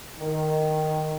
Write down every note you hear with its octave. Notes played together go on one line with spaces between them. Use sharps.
D#3